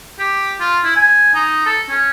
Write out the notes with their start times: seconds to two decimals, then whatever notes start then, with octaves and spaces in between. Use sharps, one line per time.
0.19 G4
0.60 F4
0.84 E4
0.95 G#5
1.34 D#4
1.66 A4
1.89 C#4